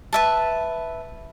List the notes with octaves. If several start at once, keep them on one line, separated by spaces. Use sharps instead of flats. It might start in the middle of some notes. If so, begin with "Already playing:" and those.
B4 E5 A5